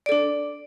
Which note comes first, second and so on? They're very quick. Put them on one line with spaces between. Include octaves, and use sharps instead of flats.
D5 A4 D4